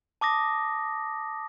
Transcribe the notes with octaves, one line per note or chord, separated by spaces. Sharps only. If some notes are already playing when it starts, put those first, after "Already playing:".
A5 D6 D#6 A#6